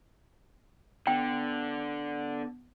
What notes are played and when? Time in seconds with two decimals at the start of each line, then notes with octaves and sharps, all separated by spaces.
1.07 D3 B3 G5